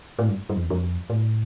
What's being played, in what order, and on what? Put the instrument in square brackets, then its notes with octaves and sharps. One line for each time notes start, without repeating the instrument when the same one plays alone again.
[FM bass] A2
G2
G2
F2
E2
F2
A2